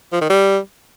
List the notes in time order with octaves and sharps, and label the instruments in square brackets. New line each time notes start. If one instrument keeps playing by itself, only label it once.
[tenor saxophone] F3
D#3
G3